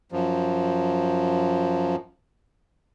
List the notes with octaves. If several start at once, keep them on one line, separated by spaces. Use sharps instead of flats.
F#2 F3